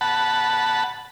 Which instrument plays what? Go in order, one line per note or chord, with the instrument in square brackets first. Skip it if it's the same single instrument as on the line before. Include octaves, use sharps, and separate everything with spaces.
[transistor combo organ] F#5 A5 B5